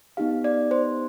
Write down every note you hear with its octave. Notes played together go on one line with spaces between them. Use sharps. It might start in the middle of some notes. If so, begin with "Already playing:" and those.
B3 D#4 G4 F5
D5
C5